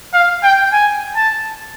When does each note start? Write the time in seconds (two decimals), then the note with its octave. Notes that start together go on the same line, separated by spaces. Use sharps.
0.14 F5
0.43 G5
0.73 G#5
1.16 A5